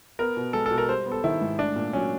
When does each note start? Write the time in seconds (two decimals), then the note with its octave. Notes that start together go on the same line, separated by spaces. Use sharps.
0.19 B3 A#4
0.37 B2
0.53 G#3 A4
0.66 A4
0.71 B2
0.78 A#4
0.89 G3 C5
1.06 B3
1.12 A4
1.24 D#3 E4
1.42 G#2
1.59 A3 D4
1.76 A#2
1.93 F#3 C#4